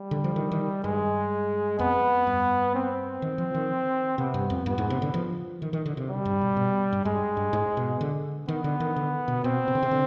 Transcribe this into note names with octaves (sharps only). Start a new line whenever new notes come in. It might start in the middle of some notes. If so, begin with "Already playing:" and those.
Already playing: G3
D3
F3
D#3
D#3
G2 G#3
F2 B3
G2
C4
D#3
F3
D#3
C3 B3
G2
F2
G2 B3
G#2
C3
D3
F3
D#3
D#3
D3
C3
G3
G2
B2
B2
G2
G2 G#3
G2
G#2
B2
D3
D#3 B3
D3
D#3
D3
B2
B2 C4
C3
D3
C3
D3